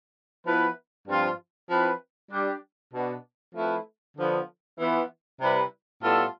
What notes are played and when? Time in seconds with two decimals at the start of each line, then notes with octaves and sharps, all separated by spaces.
0.47 F3 B3 E4 B4
1.08 G2 F3 C4 F4
1.70 F3 C4 E4 B4
2.32 G3 D4 G4
2.94 B2 B3 D4
3.55 F3 A3 C4 E4 B4
4.18 D3 F3 B3
4.80 E3 B3 F4
5.41 C3 G3 C4 E4 B4
6.03 A2 G3 B3 F4 A4